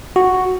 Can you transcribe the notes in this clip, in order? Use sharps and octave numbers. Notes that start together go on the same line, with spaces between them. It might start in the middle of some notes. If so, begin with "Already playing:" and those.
F#4